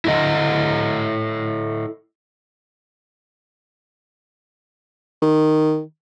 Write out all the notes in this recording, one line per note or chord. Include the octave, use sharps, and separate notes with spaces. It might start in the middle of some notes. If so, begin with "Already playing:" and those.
E4 A4 D#5
D#3